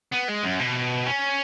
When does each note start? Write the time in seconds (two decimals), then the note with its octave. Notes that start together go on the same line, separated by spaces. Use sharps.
0.12 B3
0.28 G#3
0.43 F#2
0.59 B2
1.06 C#4